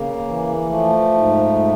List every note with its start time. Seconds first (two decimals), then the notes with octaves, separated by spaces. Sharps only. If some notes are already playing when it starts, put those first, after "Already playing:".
Already playing: C#3 A#3
0.25 E3
0.69 F3 A3
1.14 G#2
1.59 F3